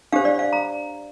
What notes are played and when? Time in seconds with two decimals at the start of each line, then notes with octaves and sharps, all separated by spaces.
0.12 D4 G4 C5 F5
0.25 D5
0.39 F5
0.53 A#5